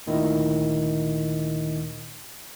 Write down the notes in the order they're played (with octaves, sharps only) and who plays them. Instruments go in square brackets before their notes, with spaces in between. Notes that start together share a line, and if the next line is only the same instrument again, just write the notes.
[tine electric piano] D2 A#2 D#3 E4 D#5